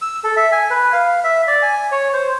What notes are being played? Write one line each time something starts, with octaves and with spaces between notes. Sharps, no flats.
E6
A4
E5
G#5
B4
F5
E5
D5
G#5
C#5
C5